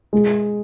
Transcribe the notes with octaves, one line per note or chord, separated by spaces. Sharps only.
G#3